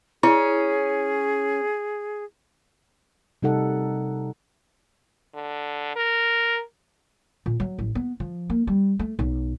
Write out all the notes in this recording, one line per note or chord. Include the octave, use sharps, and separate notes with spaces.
C#4 E4 G#4
C3 G3 D#4 A4 F#5
D3
A#4
A#2
F#3
A1
B3
F3
A#3
G3
A3
B1